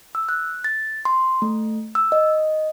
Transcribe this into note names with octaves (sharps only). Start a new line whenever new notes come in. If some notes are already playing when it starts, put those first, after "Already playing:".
E6
F#6
A6
C6
A3
E6
D#5